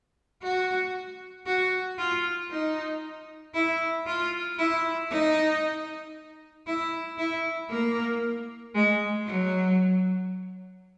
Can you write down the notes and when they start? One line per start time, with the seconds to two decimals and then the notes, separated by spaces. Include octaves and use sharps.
0.43 F#4
1.46 F#4
1.98 F4
2.51 D#4
3.54 E4
4.06 F4
4.58 E4
5.10 D#4
6.67 E4
7.18 E4
7.70 A#3
8.75 G#3
9.26 F#3